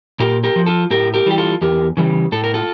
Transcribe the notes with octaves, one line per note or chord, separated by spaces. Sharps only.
A#2 G4 A#4
G4 A#4
F3
F4 A4
A2 G4 A#4
G4 A#4
E3 G3 G4
F4 A4
E2 G4 A#4
C#3 E3 G3
A2 A4
A#4
F4 A4